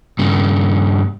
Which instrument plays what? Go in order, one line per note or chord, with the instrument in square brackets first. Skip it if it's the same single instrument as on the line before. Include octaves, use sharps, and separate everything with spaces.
[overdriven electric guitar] G2 C#3